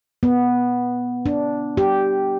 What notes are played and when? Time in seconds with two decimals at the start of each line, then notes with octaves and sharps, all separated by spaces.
0.23 B3
1.26 D4
1.77 G4